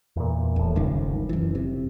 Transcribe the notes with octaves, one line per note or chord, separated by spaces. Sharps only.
E2 A#2
D#1 E2 A2
F1 C#2 G2 D#3
F#2 E3
C3